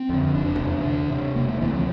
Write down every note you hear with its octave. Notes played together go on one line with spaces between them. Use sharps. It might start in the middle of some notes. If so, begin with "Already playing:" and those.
Already playing: C4
F2 D3
F1 D4
E2 C3
D2
C3
E1 A#3
A3
D2 C3 E3
F3